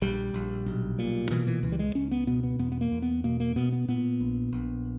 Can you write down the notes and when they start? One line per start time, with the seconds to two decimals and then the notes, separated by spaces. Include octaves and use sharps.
0.02 A#1 G3
0.34 A#1
0.66 B1
0.99 A#2
1.31 B2 E3
1.47 E3
1.63 C#2 E3
1.72 G3
1.79 G#3
1.95 C#2 C#4
2.11 B3
2.27 B2 B3
2.43 B3
2.59 E2 B3
2.72 B3
2.81 A#3
2.92 E2
3.02 B3
3.24 B2 A#3
3.40 A#3
3.56 B2 B3
3.72 B3
3.88 A#2 B3
4.20 A#1
4.52 A#1